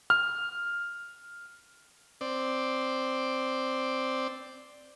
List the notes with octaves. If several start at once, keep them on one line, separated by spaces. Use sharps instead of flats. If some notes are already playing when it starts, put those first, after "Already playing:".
F6
C4 D5